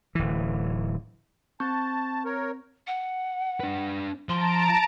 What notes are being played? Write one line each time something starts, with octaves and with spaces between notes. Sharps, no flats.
D1 E3
C4 A5 C#6 G6
A#4 C#5
F#5
D4 B4
F3 C5 A5 A#5 C6 D7